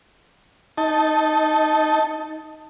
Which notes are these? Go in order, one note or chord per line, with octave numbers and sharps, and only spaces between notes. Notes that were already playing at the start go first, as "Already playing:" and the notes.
D#4 A5